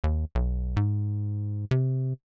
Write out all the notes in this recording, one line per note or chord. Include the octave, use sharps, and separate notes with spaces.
D#2
B1
G#2
C3